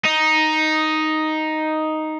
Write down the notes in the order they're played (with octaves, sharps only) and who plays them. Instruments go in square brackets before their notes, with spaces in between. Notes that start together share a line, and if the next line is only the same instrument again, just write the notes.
[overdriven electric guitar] D#4